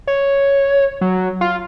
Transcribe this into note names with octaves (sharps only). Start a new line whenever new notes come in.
C#5
F#3
F4